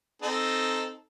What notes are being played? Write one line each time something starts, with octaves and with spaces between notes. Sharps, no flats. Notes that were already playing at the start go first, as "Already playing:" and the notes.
C4 D#4 A4